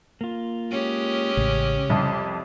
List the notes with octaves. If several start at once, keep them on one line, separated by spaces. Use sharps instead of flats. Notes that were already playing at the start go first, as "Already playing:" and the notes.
A#3 F4
G#3 C#4 G4
A1 C#3
C2 F2 G3